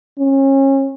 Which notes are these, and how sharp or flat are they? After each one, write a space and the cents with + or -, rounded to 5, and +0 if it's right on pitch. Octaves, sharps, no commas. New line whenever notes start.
C#4 -30